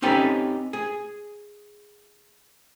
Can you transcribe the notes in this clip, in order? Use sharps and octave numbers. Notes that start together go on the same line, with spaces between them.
C4 C#4 D#4 G4 A4 B4
G#4